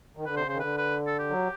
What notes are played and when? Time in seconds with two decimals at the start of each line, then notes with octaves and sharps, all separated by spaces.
0.17 D#3
0.25 D3 B4
0.36 C3 C5
0.43 C#3
0.49 C5
0.54 D#3
0.60 D3 B4
0.77 B4
1.07 A4
1.19 G4
1.30 F#3